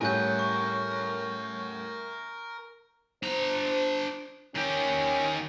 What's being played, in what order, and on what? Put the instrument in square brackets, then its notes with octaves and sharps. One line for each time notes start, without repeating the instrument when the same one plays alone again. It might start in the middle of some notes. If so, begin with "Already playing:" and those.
[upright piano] A2 G3 C#4 [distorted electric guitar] A#4 F#5 [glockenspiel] G#5 G6
[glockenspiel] C#6
[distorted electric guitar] D4 A#5 [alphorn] C5
[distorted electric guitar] D#3 G4 [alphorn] C#4